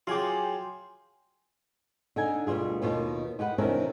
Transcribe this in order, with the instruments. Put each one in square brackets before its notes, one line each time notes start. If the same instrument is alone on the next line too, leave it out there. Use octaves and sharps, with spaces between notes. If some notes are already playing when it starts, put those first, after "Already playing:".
[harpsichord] F#3 G#4 [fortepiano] F4 D6 [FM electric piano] G5 G#5 C6
[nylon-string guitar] D3 D#4 G#5
D2 B2 G3 F4 G#4
D#2 B2 D#3 F4
D#4 G4 B4 F#5
E2 C3 D#3 C#4 D4 A#4